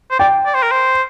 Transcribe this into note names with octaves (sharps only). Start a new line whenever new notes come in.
C5
D5 G5
D5
C5
A#4
C5